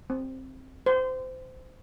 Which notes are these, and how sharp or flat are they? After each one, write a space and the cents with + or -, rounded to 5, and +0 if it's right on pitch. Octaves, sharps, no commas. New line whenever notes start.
C4 +10
C5 -25